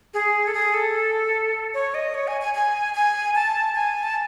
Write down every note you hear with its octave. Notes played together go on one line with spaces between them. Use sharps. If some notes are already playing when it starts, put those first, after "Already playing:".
G#4
A4
G#4
A4
C#5
D#5
C#5
G#5
G#5
G#5
G#5
A5
G#5
A5